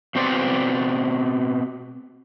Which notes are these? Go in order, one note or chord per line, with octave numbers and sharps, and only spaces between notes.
B2 C4 C5 D5